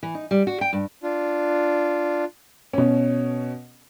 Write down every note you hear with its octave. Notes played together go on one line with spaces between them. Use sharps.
E3
D#4
G3
F#4
G5
G2
D4 F4
B2 C#4